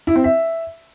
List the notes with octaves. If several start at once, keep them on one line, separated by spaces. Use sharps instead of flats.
E4
C4
E5